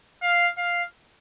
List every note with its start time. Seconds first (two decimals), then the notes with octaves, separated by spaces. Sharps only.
0.22 F5
0.58 F5